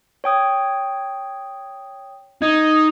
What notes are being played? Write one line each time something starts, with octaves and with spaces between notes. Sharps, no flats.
C#5 G5 D#6
D#4 G#6